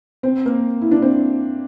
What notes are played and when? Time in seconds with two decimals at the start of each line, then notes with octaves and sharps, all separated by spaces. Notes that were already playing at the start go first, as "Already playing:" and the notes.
0.23 C4
0.46 A#3
0.81 E4
0.91 D4
1.02 C4